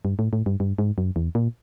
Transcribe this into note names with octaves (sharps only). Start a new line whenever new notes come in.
G2
A2
A2
G2
G2
G#2
F#2
E2
A#2